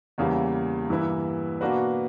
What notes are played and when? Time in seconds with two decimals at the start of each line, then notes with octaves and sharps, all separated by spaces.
0.18 E2 C#3 E3 G3 A#3
0.90 G2 E3 A#3 E4 B4
1.61 B2 A#3 D4 F#4 B4